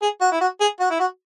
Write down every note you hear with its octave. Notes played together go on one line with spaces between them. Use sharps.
G#4
F#4
E4
F#4
G#4
F#4
E4
F#4